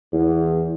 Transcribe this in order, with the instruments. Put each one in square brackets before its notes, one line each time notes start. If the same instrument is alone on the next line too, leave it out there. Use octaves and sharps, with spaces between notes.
[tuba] E2